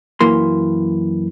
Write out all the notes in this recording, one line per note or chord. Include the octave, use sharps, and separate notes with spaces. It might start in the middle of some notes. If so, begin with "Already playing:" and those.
F#2 E3 A#3 C6